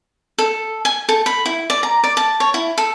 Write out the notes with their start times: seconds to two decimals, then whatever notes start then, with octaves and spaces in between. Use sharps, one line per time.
0.38 A4
0.85 G#5
1.09 A4
1.26 B5
1.46 E4
1.70 D5
1.83 A#5
2.04 D5
2.17 A5
2.40 C#5
2.54 E4
2.78 A4